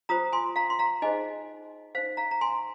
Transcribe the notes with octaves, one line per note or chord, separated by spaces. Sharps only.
F4 C5 A#5 D#6
G#5 C6
F5 A#5
C6
F5 A#5
D#4 G#4 C5 D#5 G#5
D#4 C5 F5
F5 A#5
A#5
G#5 C6